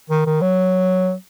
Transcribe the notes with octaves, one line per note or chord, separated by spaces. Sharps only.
D#3
D#3
F#3